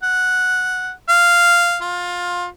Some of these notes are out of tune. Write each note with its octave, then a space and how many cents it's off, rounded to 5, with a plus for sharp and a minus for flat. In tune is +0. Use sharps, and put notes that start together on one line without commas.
F#5 -5
F5 -5
F4 +20